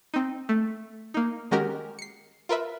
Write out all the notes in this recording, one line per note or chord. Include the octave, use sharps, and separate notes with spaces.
C4 D#4
A3
A#3 D#4
D#3 G#3 C#4 F#4 G4 A#4
C7 C#7
F4 A#4 B4 E5